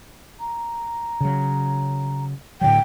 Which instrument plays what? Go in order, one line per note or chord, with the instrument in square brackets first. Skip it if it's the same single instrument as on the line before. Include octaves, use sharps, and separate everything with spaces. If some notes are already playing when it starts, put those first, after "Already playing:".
[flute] A#5
[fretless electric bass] C#3 F#3
[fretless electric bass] A2 D3 F#3 [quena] G5